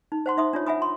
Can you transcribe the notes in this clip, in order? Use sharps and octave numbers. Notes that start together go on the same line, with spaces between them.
D#4
C5 F#5 C6
D#4 E5 C6 D#6
D4 F4 C#5
E5 F#5 G#5 B5 D#6
C6